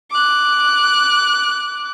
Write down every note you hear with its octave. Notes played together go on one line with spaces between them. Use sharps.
D6 F#6